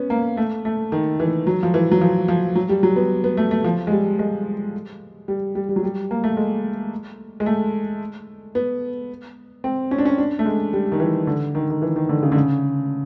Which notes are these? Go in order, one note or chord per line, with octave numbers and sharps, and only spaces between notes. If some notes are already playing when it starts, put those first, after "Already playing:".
Already playing: B3 C#4
A#3
A3
A3
D#3
E3
F#3
F3
E3
F#3
F3
F3
F#3
G3
F#3
B3
B3
A3
A3
F3
G#3
G3
G#3
G3
G3
G3
F#3
G3
A#3
A3
G#3
G#3
A3
B3
C4
C#4
D4
C#4
D4
A3
G#3
G3
D#3
E3
D3
D#3
D#3
E3
D#3
D3
C#3
D3
C#3